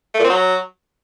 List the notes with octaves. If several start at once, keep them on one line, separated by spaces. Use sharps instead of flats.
A3
A#2
C4
F#3